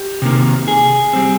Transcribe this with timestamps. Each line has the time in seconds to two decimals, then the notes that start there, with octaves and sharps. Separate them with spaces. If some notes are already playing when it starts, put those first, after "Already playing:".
Already playing: G4
0.22 C3 D#3 A#3
0.68 G#4
1.13 G3 C4